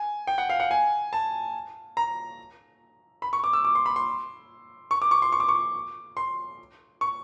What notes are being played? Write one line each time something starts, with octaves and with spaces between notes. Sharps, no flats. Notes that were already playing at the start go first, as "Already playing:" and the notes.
Already playing: G#5
G5
F#5
F5
F#5
G#5
A5
A#5
B5
C#6
D6
E6
D6
C6
B5
C6
C#6
D6
C#6
C6
C#6
D6
C#6
C6
C#6